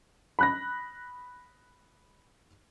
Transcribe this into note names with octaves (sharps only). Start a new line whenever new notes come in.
B5 F#6 A#6